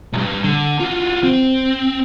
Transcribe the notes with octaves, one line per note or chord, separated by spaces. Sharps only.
C2 G2
D3
F4 F#4
C4